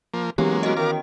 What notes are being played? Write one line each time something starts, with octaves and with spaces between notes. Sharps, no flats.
F3 A#3
E3 F#3 G#3 A#3 B3 C#4 G4
F#4 D#5
D#3 F5 A#5 D6